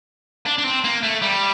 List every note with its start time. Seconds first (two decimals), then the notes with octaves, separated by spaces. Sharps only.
0.46 D4
0.58 D4
0.65 C4
0.84 A#3
1.03 A3
1.22 G3